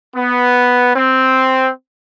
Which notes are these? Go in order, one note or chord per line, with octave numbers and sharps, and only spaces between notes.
B3
C4